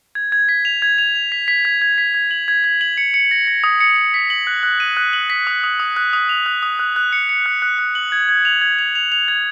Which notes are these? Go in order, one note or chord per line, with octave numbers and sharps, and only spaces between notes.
G#6
G#6
B6
F7
G#6
F7
F7
B6
B6
G#6
G#6
B6
G#6
F#7
G#6
G#6
F#7
C#7
C#7
A#6
A#6
D#6
C#7
C#7
B6
F#7
F#6
F#6
D#7
F#6
F#7
B6
D#6
D#6
D#6
F#6
D#6
F7
F#6
D#6
F#6
F#6
C#7
C#7
F#6
F#6
F#6
F#7
G#6
G#6
F7
G#6
F7
F7
F7
G#6